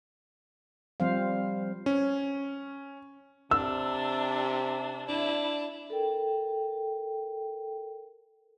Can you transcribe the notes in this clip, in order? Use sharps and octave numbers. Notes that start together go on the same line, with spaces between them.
F3 G3 C4 C5 F5
C#4
C3 D4 E6
D4 E4
A4 A#4 G5